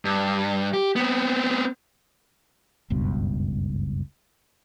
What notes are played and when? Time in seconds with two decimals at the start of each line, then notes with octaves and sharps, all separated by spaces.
0.05 G2
0.74 G4
0.96 B3 C4
2.90 F#1 C#2 G2 B2